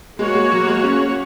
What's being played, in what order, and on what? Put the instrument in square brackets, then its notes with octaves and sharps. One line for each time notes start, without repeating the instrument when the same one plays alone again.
[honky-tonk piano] G#3 [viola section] A#3 F#4 C#5
[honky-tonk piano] G#3
F#3
G#3
C#4